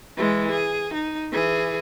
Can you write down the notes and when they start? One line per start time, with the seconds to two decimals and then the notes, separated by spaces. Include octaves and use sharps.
0.17 E3 G#3
0.51 G#4
0.94 D#4
1.32 E3 G#4